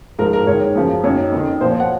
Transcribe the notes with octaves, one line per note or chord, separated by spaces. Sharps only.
G#2 F3 A#4
A#4
G#2 D#3 C#5
F#2 C#3 F3
F#2 D#3 C#5
F2 D#3
A#2 F3 C5
C#5
F#5